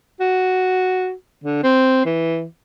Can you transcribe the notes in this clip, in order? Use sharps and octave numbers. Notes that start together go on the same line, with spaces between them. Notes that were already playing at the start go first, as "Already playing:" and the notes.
F#4
D3
C4
E3